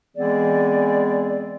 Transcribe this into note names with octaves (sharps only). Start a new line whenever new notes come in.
E3 G#3 B3 C4 G#4 D5